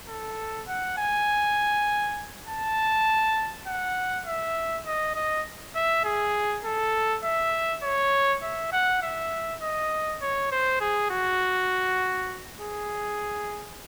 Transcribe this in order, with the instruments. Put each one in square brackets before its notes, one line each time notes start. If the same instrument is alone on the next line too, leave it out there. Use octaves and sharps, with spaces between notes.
[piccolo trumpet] A4
F#5
G#5
A5
F#5
E5
D#5
D#5
E5
G#4
A4
E5
C#5
E5
F#5
E5
D#5
C#5
C5
G#4
F#4
G#4